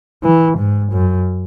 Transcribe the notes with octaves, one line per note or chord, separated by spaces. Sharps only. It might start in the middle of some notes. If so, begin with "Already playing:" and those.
E3
G#2
F#2